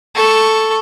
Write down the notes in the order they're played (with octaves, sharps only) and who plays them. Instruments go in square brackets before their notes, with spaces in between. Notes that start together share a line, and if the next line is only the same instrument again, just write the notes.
[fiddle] A4 C#6